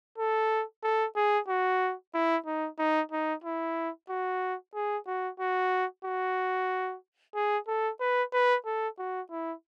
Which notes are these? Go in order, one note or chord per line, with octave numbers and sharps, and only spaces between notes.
A4
A4
G#4
F#4
E4
D#4
D#4
D#4
E4
F#4
G#4
F#4
F#4
F#4
G#4
A4
B4
B4
A4
F#4
E4